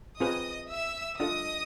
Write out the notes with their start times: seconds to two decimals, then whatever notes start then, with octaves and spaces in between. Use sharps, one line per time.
0.20 C4 F4 G#4 B4 D#5 D#6
0.70 E5 E6
1.20 D4 F4 A4 D#5 D#6